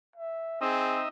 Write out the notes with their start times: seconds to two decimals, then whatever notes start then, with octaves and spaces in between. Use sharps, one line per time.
0.16 E5
0.61 C4 D#4 G#4 D#5 E5